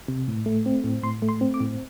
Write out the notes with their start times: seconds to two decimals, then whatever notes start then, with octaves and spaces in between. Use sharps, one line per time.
0.08 C3
0.28 A2
0.46 A3
0.66 C4
0.84 A2
1.03 A2 C6
1.22 A3
1.29 C6
1.41 C4
1.54 D6
1.60 A2